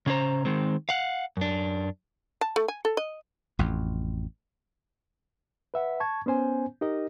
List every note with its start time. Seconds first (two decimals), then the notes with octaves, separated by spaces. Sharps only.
0.06 C#3 C#4 D4 C5 A#5
0.45 D#3 G#3 C4
0.89 F5 F#5
1.37 F#2 D4
2.41 A5
2.56 A3
2.68 G#5
2.85 A4
2.97 D#5
3.59 A1 F2
5.74 B4 E5 F#5
6.00 A5 C#6 G#6
6.26 B3 C#4 C5 G#5
6.81 D#4 G4 A#4 D#5